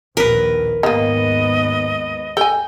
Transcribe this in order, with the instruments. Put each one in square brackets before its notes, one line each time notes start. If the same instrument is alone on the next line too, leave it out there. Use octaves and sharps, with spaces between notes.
[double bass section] A#1 D#2 [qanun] A#4 B4
[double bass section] D#2 G#2 B3 [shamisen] D#3 A#3 [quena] D#5
[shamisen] A4 G#5 [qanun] G5